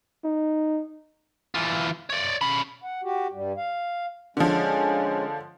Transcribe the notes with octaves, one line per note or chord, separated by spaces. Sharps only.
D#4
E3 F4
C#5 D5
C#4 B5
F#5
F#4 G4
G2 G3
F5
D3 F3 G#3 C#4